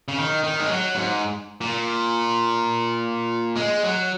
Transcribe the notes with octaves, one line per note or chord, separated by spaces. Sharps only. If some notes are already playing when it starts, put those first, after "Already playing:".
C#3
D#3
D#3
G#3
F#3
G#2
A#2
G#3
F#3